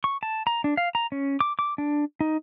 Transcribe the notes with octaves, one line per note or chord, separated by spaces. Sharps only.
C#6
A5
A#5
D4
F5
A#5
C#4
D6
D6
D4
D#4